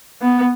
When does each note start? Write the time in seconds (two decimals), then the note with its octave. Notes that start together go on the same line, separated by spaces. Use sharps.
0.22 B3